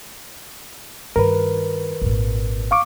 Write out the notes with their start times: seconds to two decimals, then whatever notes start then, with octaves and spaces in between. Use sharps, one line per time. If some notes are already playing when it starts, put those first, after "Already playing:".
1.16 G2 D#3 A#4 B4
2.01 G#1 A#2
2.71 F5 C#6 D6